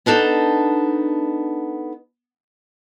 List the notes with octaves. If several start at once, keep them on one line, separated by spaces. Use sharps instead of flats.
B3 D4 D#4 A4